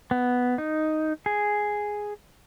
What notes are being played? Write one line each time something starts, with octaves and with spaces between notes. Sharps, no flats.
B3
D#4
G#4